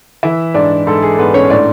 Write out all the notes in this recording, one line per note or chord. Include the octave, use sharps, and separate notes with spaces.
E3 E4 E5
G#2 D4 D5
G#2 A4
G#4
G#2 B3 B4
C#4 C#5
A2 D4 D5